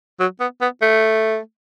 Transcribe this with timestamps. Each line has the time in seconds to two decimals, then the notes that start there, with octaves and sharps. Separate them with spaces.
0.20 F#3
0.40 B3
0.61 B3
0.82 A3